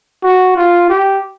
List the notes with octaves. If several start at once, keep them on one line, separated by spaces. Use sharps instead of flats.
F#4
F4
G4